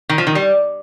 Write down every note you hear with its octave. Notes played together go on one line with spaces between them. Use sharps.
D#3
F3
D#3
G3